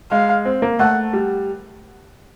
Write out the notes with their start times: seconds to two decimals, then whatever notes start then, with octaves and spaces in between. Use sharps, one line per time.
0.11 G#3 F5
0.45 C4
0.62 A#3
0.79 A3 F#5
1.13 G3